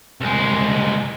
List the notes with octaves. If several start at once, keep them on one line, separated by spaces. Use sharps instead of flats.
C2 G#3